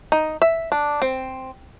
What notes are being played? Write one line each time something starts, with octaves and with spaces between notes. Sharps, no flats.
D#4
E5
D4
C4